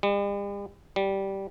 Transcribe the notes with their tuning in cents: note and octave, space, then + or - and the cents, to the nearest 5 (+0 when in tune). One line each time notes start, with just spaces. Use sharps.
G3 +45
G3 -10